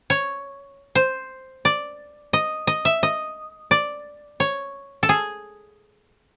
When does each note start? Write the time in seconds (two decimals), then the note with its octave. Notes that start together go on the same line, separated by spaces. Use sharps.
0.10 C#5
0.95 C5
1.65 D5
2.33 D#5
2.67 D#5
2.85 E5
3.03 D#5
3.71 D5
4.40 C#5
5.03 A4
5.09 G#4